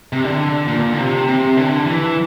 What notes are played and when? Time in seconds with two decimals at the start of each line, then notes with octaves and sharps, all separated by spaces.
0.13 C3
0.24 D3
0.68 A#2
0.93 D3
0.98 C3
1.27 C3
1.57 D3
1.86 E3